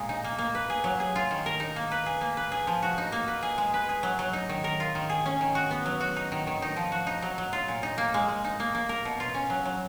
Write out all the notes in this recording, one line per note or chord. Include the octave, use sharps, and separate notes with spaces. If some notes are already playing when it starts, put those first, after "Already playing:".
Already playing: A#2 G#3
D#4
A#3
A#3
B4
G#4
F#3
G#4
F4
D#3
A#4
D#4
A#3
B4
G#4
A#3
B4
G#4
F3
F#4
D#4
A#3
B4
G#4
G#3
B4
G#4
F#3
F#3
D#4
D#3
A#4
F4
D#3
G#4
C#4
D#3
F#4
B3
F#3
F#4
D#4
D#3
D#3
D#4
F3
F#4
D#4
F#3
F#3
F4
A#2
D#4
A#3
G#3
G#3
D#4
A#3
A#3
A#4
B2
F4
C#4
F#3
F#3